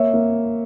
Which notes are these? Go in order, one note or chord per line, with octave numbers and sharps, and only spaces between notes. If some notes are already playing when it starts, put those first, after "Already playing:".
Already playing: A#3 C#5 E5
A#3